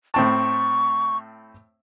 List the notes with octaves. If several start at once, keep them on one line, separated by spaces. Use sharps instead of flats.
A2 C4 A5 C#6